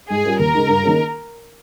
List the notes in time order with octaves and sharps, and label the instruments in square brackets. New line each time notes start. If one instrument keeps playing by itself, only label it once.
[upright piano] G#2 [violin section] G#4
[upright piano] G3 C#4 F4 A#4
[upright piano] D#2 [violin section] A#4
[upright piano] C#3 G#3 D#4
G2
D#3 A#3 C#4 G#4